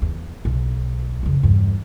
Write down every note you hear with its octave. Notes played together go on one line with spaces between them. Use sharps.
E2
B1
F2 C#3
E2 G2